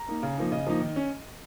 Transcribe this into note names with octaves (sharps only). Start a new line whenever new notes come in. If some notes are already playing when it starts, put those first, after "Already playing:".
Already playing: A#5
A#3 D#4
C#3
F3 A#3 D#4
C#3 D#5
F3 A#3 D#4
D#3
C#4